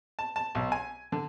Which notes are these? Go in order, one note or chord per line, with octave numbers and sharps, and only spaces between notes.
A5
A5
B1
G#5
D3